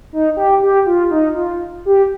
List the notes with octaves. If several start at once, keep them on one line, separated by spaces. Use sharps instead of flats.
D#4
G4
G4
F4
D#4
F4
G4